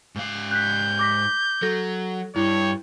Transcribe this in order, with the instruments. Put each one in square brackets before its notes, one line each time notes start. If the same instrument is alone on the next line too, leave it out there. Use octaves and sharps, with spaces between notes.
[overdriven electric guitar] G#2 F5
[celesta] F#6 B6 [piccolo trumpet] G6
[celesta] D6 A#6 B6
[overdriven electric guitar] F#3 [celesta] A4 A#6
[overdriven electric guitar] G2 [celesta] E4 [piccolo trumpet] C#5